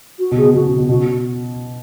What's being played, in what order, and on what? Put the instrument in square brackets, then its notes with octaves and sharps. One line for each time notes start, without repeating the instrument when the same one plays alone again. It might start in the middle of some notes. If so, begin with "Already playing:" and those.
[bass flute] F#4
[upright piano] B2
[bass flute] G#4
[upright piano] B2
[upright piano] B2 [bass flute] F#4
[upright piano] C#3
B2
[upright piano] B2 [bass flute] F#4